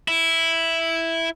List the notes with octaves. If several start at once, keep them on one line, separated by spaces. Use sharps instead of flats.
E4